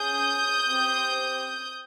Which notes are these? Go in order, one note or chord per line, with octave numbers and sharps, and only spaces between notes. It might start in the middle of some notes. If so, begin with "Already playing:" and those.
Already playing: C#4 G#4 D#6 G6
C4 G4